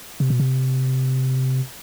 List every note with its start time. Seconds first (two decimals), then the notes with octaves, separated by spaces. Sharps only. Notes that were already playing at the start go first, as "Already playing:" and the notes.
0.20 C3
0.30 B2
0.40 C3